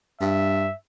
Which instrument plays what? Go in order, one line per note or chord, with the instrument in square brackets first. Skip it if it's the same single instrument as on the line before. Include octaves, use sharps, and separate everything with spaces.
[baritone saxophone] G2 [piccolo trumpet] E5